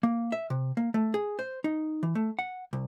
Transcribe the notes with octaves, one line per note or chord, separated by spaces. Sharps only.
A#3
E5
C3
A#3
A3
G#4
C5
D#4
E3
A3
F#5
C2